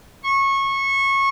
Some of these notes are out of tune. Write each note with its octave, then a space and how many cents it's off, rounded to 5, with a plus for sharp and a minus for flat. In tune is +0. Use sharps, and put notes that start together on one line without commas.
C#6 -20